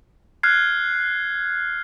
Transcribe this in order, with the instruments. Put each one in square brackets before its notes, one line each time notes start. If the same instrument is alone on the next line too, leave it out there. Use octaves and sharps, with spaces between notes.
[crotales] F6 F#6 G#6 C7